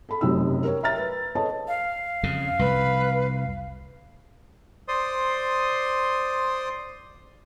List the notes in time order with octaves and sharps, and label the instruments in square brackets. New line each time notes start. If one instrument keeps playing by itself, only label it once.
[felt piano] A4 B5
F1 F#2 C3 D#4 E6
A#4 C#5
E5 A#5 F6 A6
B4
A4 B4 C#5 D#5 A5
[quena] F5
[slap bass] F2 C#3
[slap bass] C2 F2 [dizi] B4
[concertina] C5 D5 C6 D#6